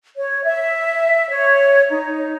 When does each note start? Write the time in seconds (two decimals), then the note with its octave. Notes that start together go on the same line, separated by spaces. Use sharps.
0.17 C#5
0.44 E5
1.30 C#5
1.90 D#4